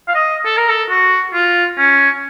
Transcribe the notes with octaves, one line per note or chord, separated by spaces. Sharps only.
F5
D#5
A4
A#4
A4
F#4
F4
C#4